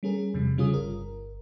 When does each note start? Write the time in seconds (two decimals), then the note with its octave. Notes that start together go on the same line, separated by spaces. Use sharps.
0.03 G3 C#4 G#4 A#4
0.34 E2 C3 F3 G3
0.57 C#3 G3 C#4 F4 G#4 D#6
0.74 G1 A#4